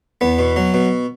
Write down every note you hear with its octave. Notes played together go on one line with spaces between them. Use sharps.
E2 B3
B2
F#3
B2